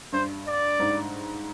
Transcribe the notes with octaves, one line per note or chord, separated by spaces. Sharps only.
G2 C5
D5
G#2